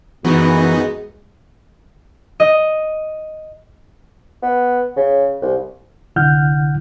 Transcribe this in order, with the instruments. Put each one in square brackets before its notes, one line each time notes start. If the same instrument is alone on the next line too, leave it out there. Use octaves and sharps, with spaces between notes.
[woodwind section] F#2 F#4 [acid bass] E3 [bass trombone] G#3 [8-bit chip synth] B3 D#4
[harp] D#5
[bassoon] B3
C#3
C2
[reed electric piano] C2 D3 E4 F#5 F6 G6